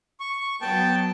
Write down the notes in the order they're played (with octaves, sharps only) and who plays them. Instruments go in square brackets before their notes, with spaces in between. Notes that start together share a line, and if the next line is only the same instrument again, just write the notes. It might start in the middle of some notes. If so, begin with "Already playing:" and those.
[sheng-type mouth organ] C#6
[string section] F#3 B3 [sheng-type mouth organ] G5 A5